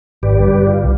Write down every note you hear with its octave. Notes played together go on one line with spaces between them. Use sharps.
G#1 G4 B4 D5
G2 D3
F4
C2